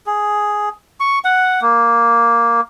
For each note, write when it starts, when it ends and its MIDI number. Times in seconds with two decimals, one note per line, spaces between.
0.06 0.69 68
1.00 1.19 85
1.24 1.60 78
1.62 2.61 58